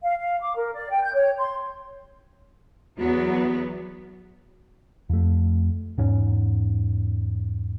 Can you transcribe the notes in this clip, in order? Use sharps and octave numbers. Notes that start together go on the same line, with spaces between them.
F5
F5
D6
A#4
D5
G5
G6
C#5
C6
E2 F#3 B3 F#4
F2 A3
E2 G#2 C#4